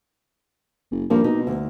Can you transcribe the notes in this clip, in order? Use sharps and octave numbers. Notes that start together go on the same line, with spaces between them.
F#1
G2 F3 A#3 C4
B2 D#4
D2